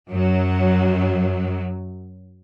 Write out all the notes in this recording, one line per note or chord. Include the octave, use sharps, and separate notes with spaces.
F#2 F#3